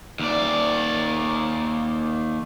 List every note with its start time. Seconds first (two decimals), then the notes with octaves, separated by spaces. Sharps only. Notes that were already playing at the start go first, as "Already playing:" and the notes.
0.19 D#2 D5